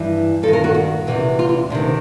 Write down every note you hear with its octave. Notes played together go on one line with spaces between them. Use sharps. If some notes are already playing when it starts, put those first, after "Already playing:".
Already playing: G2 E3
G2 A4
D#3 A#4
F#4
F#4
E2 C3 E3
F4
E4
D2 C3 D#3 D4